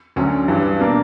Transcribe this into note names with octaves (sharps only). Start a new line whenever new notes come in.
D2 D3 F#3 C#4
G2 E3 G3
B2 A#3 D4